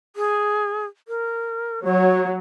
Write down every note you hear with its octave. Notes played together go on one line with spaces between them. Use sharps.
G#4
A#4
F#3 C#5